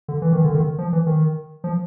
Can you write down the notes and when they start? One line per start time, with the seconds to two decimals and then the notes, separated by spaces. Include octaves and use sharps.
0.08 D3
0.22 E3
0.33 D#3
0.44 D3
0.55 D#3
0.78 F3
0.93 E3
1.07 D#3
1.64 F3